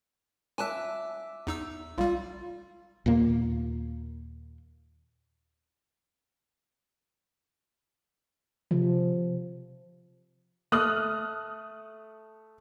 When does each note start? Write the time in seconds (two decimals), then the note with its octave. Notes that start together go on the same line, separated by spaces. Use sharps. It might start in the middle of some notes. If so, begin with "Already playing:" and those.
0.58 E5 G#5 A5 D6 F#6
1.47 E2 D#4 E6
1.98 B1 G3 F4
3.06 D#2 A#2 A#3
8.71 C3 F3
10.72 A3 D#6 F6 F#6 F#7